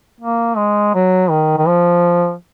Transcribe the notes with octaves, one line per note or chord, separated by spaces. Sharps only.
A#3
G#3
F#3
D#3
D#3
F3